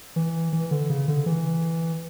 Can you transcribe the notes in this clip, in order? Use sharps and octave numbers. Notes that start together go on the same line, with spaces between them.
E3
E3
D3
C#3
D3
E3